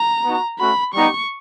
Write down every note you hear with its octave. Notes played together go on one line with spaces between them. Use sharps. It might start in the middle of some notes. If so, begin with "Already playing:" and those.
Already playing: A#5
B3 D#4 F#4
A3 C#4 F#4 B5
G3 B3 D#4 G4 C#6